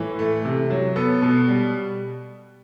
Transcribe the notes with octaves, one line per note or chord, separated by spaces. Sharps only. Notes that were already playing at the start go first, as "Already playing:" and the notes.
Already playing: A2 E3
A3
C3
F#3
B3 A4
B2
G3